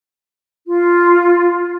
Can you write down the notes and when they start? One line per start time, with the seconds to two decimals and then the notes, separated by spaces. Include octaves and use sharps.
0.67 F4